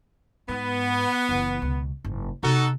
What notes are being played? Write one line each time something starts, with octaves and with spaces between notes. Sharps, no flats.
G#2 B3
F#1 E3
C#2 B2
F#1 G#2
C3 B3 D#4 F#4 A4